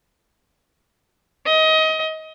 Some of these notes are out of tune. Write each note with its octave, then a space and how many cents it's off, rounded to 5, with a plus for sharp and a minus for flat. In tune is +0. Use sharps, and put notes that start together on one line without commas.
D#5 +25